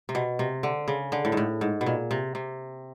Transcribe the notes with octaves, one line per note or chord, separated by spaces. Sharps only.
C3
B2
C3
D3
C#3
D3
A2
G#2
A2
G#2
B2
A#2
C3
C3